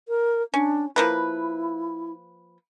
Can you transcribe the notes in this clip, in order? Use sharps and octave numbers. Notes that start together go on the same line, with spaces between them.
A#4
C#4 D4
F3 A#3 E4 B4